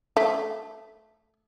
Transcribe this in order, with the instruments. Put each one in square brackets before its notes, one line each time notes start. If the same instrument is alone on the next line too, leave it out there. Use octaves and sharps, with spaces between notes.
[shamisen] A3